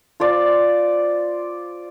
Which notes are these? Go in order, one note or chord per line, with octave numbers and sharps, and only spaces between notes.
F4 C5 D5